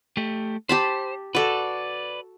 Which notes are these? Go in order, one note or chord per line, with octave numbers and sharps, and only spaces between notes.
A3 G4
G4 C5 A5 B5
F#4 A4 B4 D5